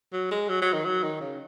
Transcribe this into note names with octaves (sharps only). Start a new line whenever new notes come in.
F#3
G#3
F#3
F#3
D#3
F#3
D#3
C#3